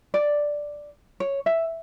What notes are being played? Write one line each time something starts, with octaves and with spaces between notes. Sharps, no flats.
D5
C#5
E5